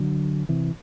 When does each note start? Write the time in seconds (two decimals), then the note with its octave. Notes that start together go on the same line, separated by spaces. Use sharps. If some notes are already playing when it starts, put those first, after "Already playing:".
Already playing: D3 F#3
0.49 C3 E3